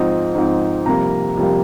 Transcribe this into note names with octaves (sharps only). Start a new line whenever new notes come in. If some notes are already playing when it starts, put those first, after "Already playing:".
Already playing: G#2 F3 C4 D#4
G#2 F3 C4 D#4
F2 C3 G3 A#3 A#5
F2 C3 G3 A#3